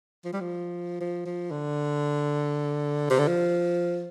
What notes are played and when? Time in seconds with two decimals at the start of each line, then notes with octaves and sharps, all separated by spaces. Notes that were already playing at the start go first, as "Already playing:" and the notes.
0.25 F3
0.33 G3
0.41 F3
1.00 F3
1.26 F3
1.51 D3
3.10 C3
3.19 D3
3.28 F3